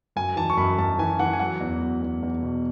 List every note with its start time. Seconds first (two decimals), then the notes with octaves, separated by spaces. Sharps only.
0.16 F#2 G#5
0.36 E3 A5
0.50 C#6
0.57 F#2 B5
0.78 F#2 A5
0.98 E3 G#5
1.19 E3 F#5
1.33 G#5
1.39 F#3 F#5
1.61 E2
1.81 F#3
2.02 E2
2.23 E2
2.43 B2